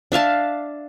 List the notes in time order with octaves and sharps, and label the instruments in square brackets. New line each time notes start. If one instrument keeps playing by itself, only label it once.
[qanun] D4 E5 F5 A5